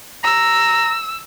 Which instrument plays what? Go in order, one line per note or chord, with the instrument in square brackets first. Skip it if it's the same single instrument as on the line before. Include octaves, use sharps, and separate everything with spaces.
[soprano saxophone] A#5 [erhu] E6